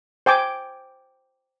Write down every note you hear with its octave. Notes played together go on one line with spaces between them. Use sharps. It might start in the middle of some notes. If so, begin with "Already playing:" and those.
C5 G5 G#5 D6